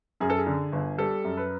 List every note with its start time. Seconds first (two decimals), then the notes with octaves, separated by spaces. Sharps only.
0.20 F#2 G#4
0.30 A4
0.38 G#4
0.47 D3
0.73 G1
0.98 G3 A4
1.25 F#2
1.37 B4